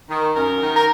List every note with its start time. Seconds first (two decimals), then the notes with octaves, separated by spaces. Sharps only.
0.10 D#3
0.36 F#2 A#4
0.62 D#3
0.76 A#4